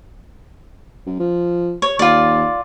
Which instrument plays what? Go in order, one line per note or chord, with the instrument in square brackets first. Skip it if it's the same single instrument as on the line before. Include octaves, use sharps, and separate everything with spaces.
[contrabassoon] F#2
F3
[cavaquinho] C#5
[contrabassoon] D#2 [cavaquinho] F4 D5